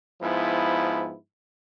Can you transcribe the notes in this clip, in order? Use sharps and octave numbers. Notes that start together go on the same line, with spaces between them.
G#2 F3 B3 E4